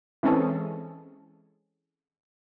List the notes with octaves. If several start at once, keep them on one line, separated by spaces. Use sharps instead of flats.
E3 G#3 C4 C#4 G#4 A4